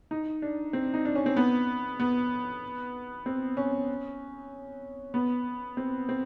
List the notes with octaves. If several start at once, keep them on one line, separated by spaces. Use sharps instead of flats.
D#4
D4
C4
D#4
D4
C#4
C4
B3
B3
C4
C#4
B3
C4
C4